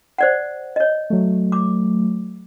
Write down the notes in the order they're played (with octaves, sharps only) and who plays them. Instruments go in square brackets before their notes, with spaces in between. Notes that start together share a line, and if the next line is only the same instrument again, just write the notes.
[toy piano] C5 D5 F#5
C#5 D#5
[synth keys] F#3 A3
[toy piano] D6